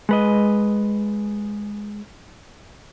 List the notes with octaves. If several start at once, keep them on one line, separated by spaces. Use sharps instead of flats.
G#3 B4 D#5